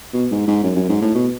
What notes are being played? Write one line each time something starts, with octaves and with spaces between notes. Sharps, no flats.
B2
G#2
G#2
F#2
F#2
G#2
A2
B2